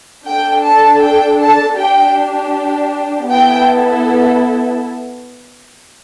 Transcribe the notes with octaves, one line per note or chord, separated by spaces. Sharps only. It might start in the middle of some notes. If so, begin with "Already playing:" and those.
D4 A4 G5
A5
G5
A5
D4 G4 G5
B3 E4 A4 G5